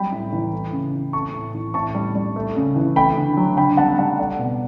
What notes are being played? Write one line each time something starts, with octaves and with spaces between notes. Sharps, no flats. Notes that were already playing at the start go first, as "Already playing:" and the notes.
Already playing: F#3 G3 G5 B5
A2
E3
A3
C#3
E3
A3 A5 C#6
A2
E3
A2 A5 C#6
G3
G3
A3
C#3
E3
A3 G5 B5
D3
F#3
D3 G5 B5
G3 F#5 A5
G3 F#5 A5
A3 D5 F#5
B2